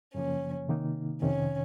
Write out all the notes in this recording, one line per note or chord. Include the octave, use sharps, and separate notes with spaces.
F#2 C#3 F3 A#3 C#4
C3 D#3 A#3 D#4
F2 C3 D#3 C#4